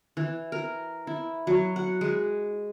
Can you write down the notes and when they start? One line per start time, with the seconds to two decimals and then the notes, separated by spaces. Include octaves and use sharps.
0.17 E3
0.52 A#4
1.07 E4
1.47 F#3
1.76 F#5
2.01 G#3